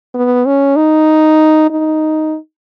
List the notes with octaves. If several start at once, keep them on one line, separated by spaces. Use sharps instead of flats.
B3
C#4
D#4
D#4